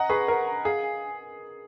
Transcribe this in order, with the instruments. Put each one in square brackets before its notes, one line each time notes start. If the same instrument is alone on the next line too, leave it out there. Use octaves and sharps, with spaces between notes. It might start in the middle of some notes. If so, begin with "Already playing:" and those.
Already playing: [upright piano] D#5 F#5 [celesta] A#5
[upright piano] G#4 B4 [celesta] C#6
[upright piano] A#4 [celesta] F#5
[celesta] A#5
[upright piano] G#4 [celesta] F5
[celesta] G#5